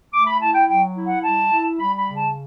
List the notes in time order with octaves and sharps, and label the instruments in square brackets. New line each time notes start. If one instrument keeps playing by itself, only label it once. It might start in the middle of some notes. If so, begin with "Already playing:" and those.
[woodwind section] A3 D6
B5
E4 A5
G5
F#3 G5
E4
F#5
G3 A5
E4
G3 B5
B5
C#3
A5